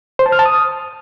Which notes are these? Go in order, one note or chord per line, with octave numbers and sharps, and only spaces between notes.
C5
A5
F6
A5
D#6